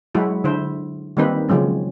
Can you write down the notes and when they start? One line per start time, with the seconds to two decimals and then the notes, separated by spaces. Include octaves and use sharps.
0.15 F#3 G#3 E4 F#4
0.44 D3 E4 C5
1.17 D#3 G3 A#3 C4 D#4 B4
1.49 C#3 F3 F#3 G#3 C#4